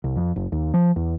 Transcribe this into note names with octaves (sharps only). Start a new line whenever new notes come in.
C2
F2
F#1
D#2
F3
E2